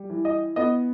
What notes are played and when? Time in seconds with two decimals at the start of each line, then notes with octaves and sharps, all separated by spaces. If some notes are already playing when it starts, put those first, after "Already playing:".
Already playing: G3
0.10 E3
0.25 D#5
0.56 B3 D#5